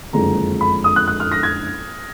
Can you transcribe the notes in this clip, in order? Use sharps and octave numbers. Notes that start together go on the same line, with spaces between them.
F#1 F2 D3 G#3 D4 A#5
B5
D#6
F#6
F#6
F6
A#6
G#6